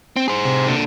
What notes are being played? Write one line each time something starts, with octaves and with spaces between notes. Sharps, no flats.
C4
G#4 C5
C3
A#2 D3